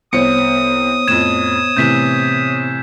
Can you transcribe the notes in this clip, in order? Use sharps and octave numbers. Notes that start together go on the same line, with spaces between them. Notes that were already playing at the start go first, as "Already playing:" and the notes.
C2 B3 C5 C#5 D#6 C#7
F2 A2 G#6 E7
A2 C3 E3 G6 B6 E7